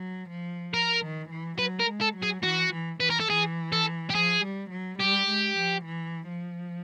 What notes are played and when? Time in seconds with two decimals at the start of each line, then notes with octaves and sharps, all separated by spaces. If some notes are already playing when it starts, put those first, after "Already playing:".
Already playing: F#3
0.31 F3
0.74 A#4
1.02 D#3
1.30 E3
1.59 F#3 B4
1.80 A#4
1.87 G#3
2.01 A4
2.16 F#3
2.23 G#4
2.44 E3 F#4
2.72 E3
3.00 E3 B4
3.10 A#4
3.20 A4
3.30 E3 G#4
3.72 A4
4.10 G4
4.15 F3 G#4
4.43 G3
4.71 F#3
5.00 G3 G4
5.28 G#3
5.56 F3
5.86 E3
6.28 F3